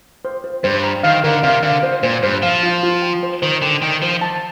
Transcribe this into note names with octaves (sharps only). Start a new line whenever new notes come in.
C5
C5
G2 C5
A#5
D#3 F5
D3 A#4
C3 F5
D3 F5
C5
A#2 C5
G2 C5
F3 F5
F4
F4
G5
C5
D#3 C5
D3 G5
D#3 G5
F3 C5
A5